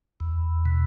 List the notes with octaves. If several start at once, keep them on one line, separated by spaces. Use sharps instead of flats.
E2
B2